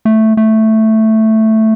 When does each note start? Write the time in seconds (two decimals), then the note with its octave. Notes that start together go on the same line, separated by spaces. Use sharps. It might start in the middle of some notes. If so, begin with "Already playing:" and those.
0.05 A3
0.37 A3